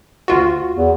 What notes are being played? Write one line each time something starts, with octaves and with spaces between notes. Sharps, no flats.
D2 F4 F#4
E2